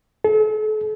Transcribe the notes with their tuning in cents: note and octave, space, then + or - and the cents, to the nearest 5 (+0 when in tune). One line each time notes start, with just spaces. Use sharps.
A4 -40